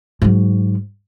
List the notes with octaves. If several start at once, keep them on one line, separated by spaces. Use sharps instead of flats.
G#2 F#3